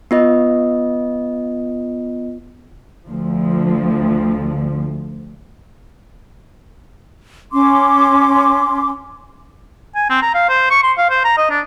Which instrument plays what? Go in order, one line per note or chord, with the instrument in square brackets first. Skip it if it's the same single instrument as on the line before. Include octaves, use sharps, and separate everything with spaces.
[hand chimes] B3 F4 D#5
[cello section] D2 F3
[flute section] C#4 C6 D6
[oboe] G#5
C4
A#5
F5
C5
C#6
C6
F5
C5
A#5
D#5
D4